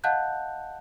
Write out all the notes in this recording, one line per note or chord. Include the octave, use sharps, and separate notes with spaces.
D#5 F5 F#5 A5 F#6 G6